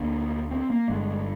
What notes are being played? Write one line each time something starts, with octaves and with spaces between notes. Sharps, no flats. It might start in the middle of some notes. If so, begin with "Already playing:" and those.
Already playing: D2 D3 A#3
C4
A#3
G1 G2 D3 G#3